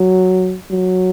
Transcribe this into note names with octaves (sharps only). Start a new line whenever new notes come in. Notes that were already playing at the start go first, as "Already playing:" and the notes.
Already playing: F#3
F#3